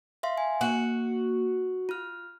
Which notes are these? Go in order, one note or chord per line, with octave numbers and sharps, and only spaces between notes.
E5 F5 C6
G#5
A#3 F#4
F4 F6